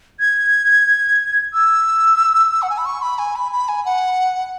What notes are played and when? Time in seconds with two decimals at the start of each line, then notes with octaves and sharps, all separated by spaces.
0.20 G#6
1.54 E6
2.62 F#5
2.70 G#5
2.78 B5
2.85 C#6
3.02 B5
3.19 G#5
3.36 B5
3.52 B5
3.68 G#5
3.85 F#5